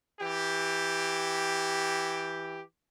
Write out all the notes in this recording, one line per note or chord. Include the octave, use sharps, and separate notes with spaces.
E3 G4